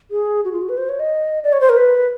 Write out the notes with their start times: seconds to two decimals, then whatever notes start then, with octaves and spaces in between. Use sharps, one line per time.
0.11 G#4
0.45 F#4
0.52 F4
0.62 F#4
0.69 B4
0.77 C5
0.89 C#5
0.99 D#5
1.44 D5
1.53 C#5
1.61 C5
1.69 A#4
1.77 B4